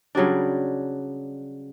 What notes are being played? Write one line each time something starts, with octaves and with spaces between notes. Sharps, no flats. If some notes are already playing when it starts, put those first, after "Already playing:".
C#3 F#3 G3 D4